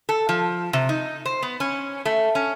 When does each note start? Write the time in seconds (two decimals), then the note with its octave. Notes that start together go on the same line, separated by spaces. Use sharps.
0.09 A4
0.29 F3
0.73 C3
0.89 D#4
1.26 C5
1.43 B3
1.60 C#4
2.05 A3
2.35 C#4